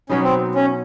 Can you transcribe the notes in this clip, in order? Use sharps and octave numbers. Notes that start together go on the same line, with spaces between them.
B2 F#3 B3 C#4 D#4
C4
C#4